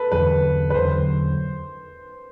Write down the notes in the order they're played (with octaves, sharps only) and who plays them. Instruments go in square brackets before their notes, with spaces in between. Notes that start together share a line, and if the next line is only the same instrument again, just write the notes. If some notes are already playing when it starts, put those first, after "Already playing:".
Already playing: [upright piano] A4 B4
[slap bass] E2 D3 F#3 [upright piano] B4
[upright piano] B4
[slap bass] E2 D3 F#3 [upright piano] C5